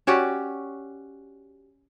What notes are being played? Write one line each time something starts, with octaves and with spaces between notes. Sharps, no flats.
C#4 F#4 G4 D5